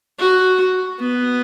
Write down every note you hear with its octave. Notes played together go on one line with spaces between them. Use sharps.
F#4
B3